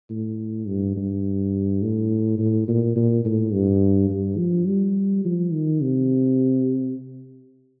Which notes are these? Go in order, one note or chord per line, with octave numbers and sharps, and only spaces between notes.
A2
G2
G2
A2
A2
A#2
A#2
A2
G2
G2
F3
G3
F3
D#3
C3